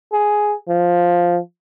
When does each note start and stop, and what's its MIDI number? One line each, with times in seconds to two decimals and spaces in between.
0.13 0.55 68
0.68 1.38 53